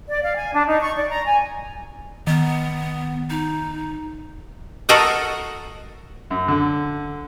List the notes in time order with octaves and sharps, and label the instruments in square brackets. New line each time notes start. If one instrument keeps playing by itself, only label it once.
[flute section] D5
F5
G#5
D4
D#4
C#6
D5
A#5
G#5
[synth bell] D#3 [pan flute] B3
[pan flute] D#4
[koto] F#4 A4 A#4 D#5 F#5
[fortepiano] F#2
D3